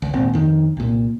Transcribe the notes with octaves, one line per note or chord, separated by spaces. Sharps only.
C#2
G#1 D#2 A#2 C4
F2 D#3
C2 A#2